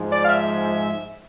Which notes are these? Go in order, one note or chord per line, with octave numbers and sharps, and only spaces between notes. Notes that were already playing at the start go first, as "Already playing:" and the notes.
Already playing: G#2 F3 G#3
D5
F5
E5